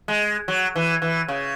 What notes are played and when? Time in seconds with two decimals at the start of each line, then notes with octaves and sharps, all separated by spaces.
0.08 G#3
0.48 F#3
0.76 E3
1.02 E3
1.28 C#3